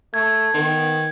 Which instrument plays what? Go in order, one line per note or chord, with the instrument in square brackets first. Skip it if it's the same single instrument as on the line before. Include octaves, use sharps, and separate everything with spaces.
[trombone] A3 [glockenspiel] G#6
[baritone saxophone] D#3 [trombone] B3